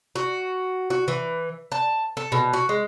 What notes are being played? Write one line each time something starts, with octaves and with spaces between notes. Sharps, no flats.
F#4
F#4
E3
A5
A4
B2
F#4
G#3